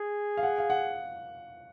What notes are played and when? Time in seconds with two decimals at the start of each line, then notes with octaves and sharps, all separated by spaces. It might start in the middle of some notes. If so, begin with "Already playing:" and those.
Already playing: G#4
0.37 F5
0.43 F#5
0.58 F5
0.70 F#5